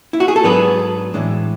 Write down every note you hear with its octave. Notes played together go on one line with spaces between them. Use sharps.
E4
F#4
G#4
A4
G#2 F#3 B3 D4 G#4 B4
A2 E3 G#3 D4